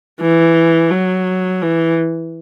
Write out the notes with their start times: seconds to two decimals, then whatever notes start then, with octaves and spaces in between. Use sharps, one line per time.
0.21 E3
0.91 F#3
1.62 E3